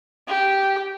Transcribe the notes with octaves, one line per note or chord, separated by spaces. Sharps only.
G4